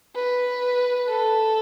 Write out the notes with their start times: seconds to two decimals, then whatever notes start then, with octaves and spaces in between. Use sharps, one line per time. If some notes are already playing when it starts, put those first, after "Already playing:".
0.15 B4
1.10 A4